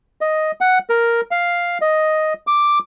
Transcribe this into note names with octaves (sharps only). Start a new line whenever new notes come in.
D#5
F#5
A#4
F5
D#5
D6